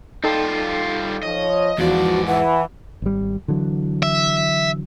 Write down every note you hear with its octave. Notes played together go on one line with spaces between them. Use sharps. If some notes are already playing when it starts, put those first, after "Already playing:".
G3 D#4 F4 A4 G5
F3 C#5 D#5
E2 G#2 E3 F3 F#4 D5
E3 F#5
G#1 G3
D3 E3 F#3
E5